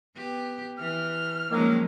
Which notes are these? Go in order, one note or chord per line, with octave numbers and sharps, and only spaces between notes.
B3 G4
E3 F6
D#3 F3 F#3 G#3 A#3 C#4